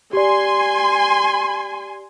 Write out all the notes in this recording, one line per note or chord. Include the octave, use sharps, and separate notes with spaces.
G4 D5 G#5 C6